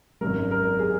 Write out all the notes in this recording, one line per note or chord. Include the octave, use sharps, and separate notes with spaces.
G#1 F#2 F#3 A#4
A#4
G#4